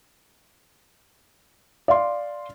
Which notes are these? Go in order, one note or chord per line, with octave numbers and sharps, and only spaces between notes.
D5 F5 C6